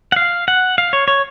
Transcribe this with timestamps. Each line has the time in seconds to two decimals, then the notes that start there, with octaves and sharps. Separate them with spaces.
0.12 F#5
0.16 F5
0.48 F#5
0.78 F5
0.93 C#5
1.08 C#5